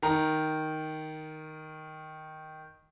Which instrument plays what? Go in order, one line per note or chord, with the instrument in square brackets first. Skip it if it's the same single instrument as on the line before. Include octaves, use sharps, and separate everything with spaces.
[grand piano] D#3 A#5